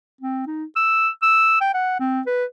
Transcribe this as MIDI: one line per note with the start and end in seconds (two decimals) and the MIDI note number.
0.21 0.45 60
0.47 0.65 63
0.76 1.09 88
1.23 1.60 88
1.61 1.69 79
1.74 1.99 78
2.00 2.21 60
2.27 2.45 71